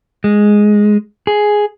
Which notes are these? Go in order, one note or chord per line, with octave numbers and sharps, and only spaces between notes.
G#3
G#4